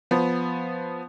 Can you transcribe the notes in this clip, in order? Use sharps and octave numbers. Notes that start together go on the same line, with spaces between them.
F3 B3